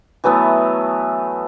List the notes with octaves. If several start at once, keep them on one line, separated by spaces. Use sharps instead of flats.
E3 F#3 A3 B3